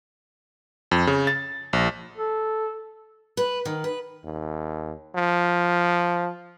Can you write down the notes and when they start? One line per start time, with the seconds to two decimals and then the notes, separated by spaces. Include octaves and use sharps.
0.91 F2
1.07 C#3
1.27 A6
1.73 A#1
2.17 A4
3.37 B4
3.65 D#3
3.84 B4
4.25 D#2
5.16 F3